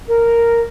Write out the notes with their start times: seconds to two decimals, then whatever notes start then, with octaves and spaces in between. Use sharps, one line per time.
0.07 A#4